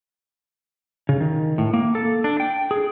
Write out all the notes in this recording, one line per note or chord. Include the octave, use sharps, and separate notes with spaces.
C#3
D#3
A2
A#3
A4
D4
G5
G#4